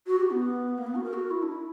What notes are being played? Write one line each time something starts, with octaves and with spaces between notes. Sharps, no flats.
F#4
G4
B3
A#3
B3
F#4
A#4
F#4
E4
D4
E4